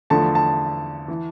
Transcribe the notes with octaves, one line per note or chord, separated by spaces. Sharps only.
E2 D3 F3 A3 A5
A5
E3